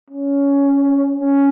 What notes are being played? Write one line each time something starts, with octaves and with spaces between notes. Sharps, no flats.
C#4
C#4